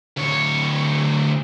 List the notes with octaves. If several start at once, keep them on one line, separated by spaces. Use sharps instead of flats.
D2 C#5